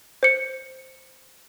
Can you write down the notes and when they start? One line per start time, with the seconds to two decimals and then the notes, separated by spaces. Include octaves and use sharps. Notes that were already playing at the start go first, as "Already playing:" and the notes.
0.23 C5 C#7